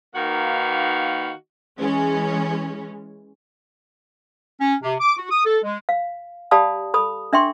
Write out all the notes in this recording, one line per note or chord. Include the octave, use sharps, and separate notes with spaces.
D#3 A#3 D#4 F#4 B4 F5
E3 G#3 C#4
C#4
C3
D6
F#4
D#6
A4
G#3
F5
G4 D5 F5 A5 B5 D#6
A4 B5 D#6
D4 E5 G5 C6 C#6